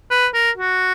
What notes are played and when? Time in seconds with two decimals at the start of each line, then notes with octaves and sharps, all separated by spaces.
0.11 B4
0.34 A#4
0.57 F#4